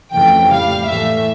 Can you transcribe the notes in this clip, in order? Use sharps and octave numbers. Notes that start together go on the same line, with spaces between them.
F2 C#3 E3 A3 G5
A2 G3 F5
A2 E3 A3 E5